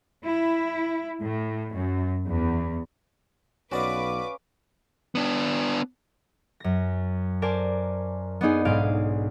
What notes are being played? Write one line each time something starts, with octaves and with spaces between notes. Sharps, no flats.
E4
A2
F#2
E2
B1 C#4 F#4 B4 D5 D#5 F5 D6
B3 D4
F#2 A#6
A#4 C5 D5 G#5 A5
B3 D4 D#4 G#4
B1 G#2 G#4 F5 C6 D7